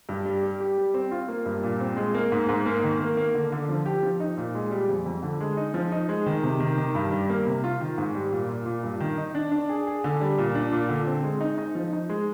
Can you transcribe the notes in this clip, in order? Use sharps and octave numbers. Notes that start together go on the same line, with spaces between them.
G2
G3
G3
G4
G3
C4
F4
A#3
G2
A#2
C4
G#3
A#3
G#2
G#2
A#3
D#3
A#3
A#3
D3
D3
F3
G4
F3
D#4
A#2
G#3
G3
F2
F2
D3
G#3
D#4
F3
D#4
G#3
D#3
C3
D#3
D#3
G2
G3
A#3
C3
F4
D#3
G#2
G3
A#2
A#2
A#2
G2
D#3
D#4
D4
D4
G#4
G#4
D3
G3
A#2
D4
A#2
D3
C4
G#3
D#4
D#4
F3
D#4
G#3